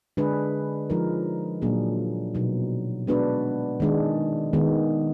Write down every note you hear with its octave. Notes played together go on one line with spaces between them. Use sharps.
D3 G#3 D4 G#4 B4
F3 G#3 D#4 A#4
A#2 F#3 A#3 D4 G#4
B2 F#3 B3 D#4
G#3 B3 D4 F#4 B4
D#3 G#3 D4
D#3 G#3 B3